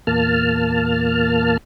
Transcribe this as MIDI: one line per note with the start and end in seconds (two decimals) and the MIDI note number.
0.07 1.57 40
0.07 1.57 46
0.07 1.57 58
0.07 1.57 81
0.07 1.57 89